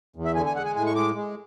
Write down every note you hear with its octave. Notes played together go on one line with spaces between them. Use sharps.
E2
E5
D3 G#5
G#5
G#3 F#5
G#5
A2 G#5
C#6
G#3 D6
G#3